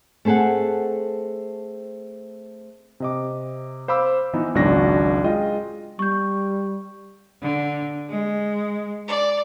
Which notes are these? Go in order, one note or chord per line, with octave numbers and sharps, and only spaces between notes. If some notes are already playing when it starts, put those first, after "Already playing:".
A3 C4 G#4 A4 F#5
C3 D#5 D6
C5 F5 B5 D6 E6
E3 F3 B3 D#4
G#1 C#2 F#3 D4 F#4 A#6
G#3 F4 D#5 G5
G3 C#6 G6
D3
G#3
D5